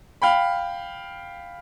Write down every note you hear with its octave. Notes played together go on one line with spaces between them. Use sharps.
F5 G5 B5